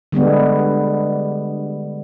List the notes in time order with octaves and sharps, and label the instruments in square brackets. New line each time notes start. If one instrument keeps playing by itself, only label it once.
[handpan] D3 G3 G#3 B3